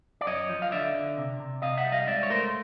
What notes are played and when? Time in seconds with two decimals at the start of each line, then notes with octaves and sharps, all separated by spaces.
0.21 D5
0.26 F#2 C#5 D#5
0.49 F3
0.62 F5
0.72 D3 D5 E5
0.94 D3
1.17 C3
1.40 C3
1.62 C3 D#5 F5
1.78 E5 F#5
1.85 G3
1.92 D#5 F5
2.07 G#2 D5 E5
2.23 C#5
2.30 A3 A#4 C5